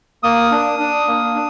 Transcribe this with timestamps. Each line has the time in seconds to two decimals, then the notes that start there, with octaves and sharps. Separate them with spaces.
0.23 A#3 D#6
0.51 D4
0.79 D4
1.08 A#3
1.35 D4